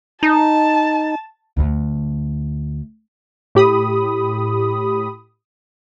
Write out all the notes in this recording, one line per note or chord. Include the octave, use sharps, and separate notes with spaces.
D#4 A5
D2 D3
A2 G4 B5 D#6